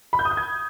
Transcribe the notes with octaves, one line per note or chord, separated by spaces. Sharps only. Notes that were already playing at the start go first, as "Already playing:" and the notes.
B5
G6
D#6
G6
G#6